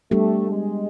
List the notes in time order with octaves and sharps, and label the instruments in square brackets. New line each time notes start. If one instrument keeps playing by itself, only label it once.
[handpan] G3 B3 D4 G4 [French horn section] A3
[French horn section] G#3